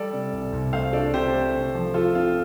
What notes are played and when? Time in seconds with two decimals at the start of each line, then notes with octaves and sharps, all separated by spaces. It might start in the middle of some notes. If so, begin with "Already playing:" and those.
Already playing: G3 A4 D5
0.13 C3
0.33 C2
0.53 C2
0.73 A3 C5 F5
0.93 D4 A4 D5
1.14 C3 G4 C5
1.34 A3
1.54 C3
1.75 F3
1.94 F3 F4 A4
2.15 C4 F4